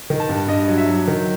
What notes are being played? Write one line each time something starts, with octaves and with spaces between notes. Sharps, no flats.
D#3
A5
G2
G2 D#5
F#3
E5
F#3
D#3